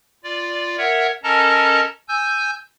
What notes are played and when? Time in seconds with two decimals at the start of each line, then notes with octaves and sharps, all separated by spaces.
0.24 F4 D5
0.78 A#4 C#5 E5 F#5
1.23 C#4 A4 A#4 D#5 A5 A#5
2.08 G#5 E6 G6